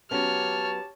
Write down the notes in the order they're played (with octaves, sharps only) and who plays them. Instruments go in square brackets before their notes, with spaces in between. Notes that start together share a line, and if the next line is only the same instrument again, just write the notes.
[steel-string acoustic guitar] F#3 B3 C#4 [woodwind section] G4 A5 [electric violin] C#5 F6